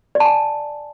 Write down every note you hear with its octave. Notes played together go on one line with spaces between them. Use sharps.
D5
A5
G#5